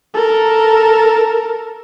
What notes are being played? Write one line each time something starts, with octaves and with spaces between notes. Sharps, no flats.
A4 A#4